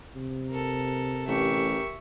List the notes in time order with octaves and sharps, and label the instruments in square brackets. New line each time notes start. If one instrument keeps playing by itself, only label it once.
[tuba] C3
[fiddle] A4 A#4
[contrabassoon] A1 [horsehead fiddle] G4 A#4 [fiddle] E5 C#6